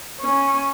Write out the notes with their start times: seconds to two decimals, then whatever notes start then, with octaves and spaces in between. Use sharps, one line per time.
0.21 C#4